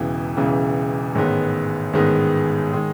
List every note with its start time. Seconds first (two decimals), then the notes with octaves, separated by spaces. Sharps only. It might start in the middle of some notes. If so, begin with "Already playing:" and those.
Already playing: E1 E2 C#3 E3
0.37 E1 E2 C#3 E3
1.15 A1 G#2 D#3 G#3 B3
1.93 A1 G#2 D#3 G#3 B3
2.73 D#3 G#3